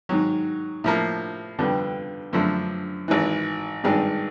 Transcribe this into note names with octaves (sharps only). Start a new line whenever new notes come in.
G#2 D#3 F#3
A2 F3 A#3
F2 D3 G3 B3 D4
F#2 D3 F3 A3 D4
G#1 G#2 E3
G#1 G2 D#3 G#3